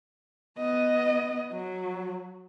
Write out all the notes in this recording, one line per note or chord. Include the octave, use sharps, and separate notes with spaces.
B3 D#5
F#3